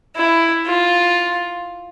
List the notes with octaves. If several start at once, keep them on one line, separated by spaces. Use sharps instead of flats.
E4
F4